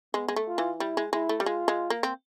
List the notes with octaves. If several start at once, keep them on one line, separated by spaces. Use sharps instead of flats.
G#3 B3
G#3
A3
F4
E3
G3 E4
G#3
G#3 E4
A3
G3
G#3 F4
G#3
A#3
C4